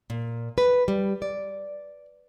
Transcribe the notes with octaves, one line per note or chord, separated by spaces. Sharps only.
A#2
B4
G3
D5